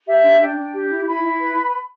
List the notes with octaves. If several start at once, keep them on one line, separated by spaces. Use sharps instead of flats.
G4 E5
D4
D4 G5
D4
G4
E4
E4 B5
E4
B4